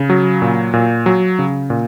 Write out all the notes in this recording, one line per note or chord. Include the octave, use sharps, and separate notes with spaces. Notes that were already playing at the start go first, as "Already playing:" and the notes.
Already playing: C#3
F#3
A#2
A#2
F#3
C#3
A#2